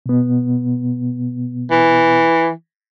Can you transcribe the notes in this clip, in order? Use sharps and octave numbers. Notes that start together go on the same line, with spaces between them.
B2 B3
E3